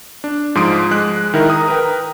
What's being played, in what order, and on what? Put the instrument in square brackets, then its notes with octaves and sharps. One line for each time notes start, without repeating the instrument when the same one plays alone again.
[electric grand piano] D4
G#2 F3 C6 D#6 D7
G#3 F#6
D#3 E4 A#4
A#5 D#6
A#4 B4 G5